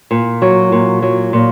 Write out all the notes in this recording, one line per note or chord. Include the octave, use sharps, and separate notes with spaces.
A#2
F#3
A#2
F#3
A#2